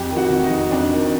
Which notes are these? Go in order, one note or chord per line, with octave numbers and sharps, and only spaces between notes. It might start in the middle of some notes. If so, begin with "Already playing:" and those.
Already playing: F2 G4 G5
D#3
F#4 F#5
C3
D#4 D#5
F2
F2 D4 D5
D#3